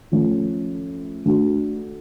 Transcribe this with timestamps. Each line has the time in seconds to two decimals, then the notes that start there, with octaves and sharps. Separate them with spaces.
0.12 F3 A3 C#4
1.26 A3 D4 F#4